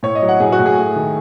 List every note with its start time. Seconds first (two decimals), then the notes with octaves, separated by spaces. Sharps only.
0.03 A2 C#5
0.15 D#5
0.22 F#3
0.29 F#5
0.40 A2 G#4
0.52 F#4
0.59 A2
0.66 G#4
0.77 A3
0.96 D#3